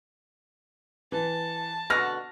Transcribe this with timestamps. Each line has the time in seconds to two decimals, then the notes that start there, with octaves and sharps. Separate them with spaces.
1.12 E3 A5
1.90 B2 D3 F#4 F6 A#6